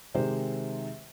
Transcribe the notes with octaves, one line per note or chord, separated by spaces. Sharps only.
C3 D#3 G#3 G4 C5